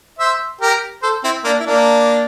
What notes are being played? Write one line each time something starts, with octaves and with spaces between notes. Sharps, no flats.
C5 E5
G4 A#4
A4 C5
C4 E4
A#3 D4
E4
A#3 D4